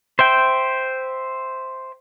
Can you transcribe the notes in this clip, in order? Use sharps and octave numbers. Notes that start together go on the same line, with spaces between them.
C5 E5 G5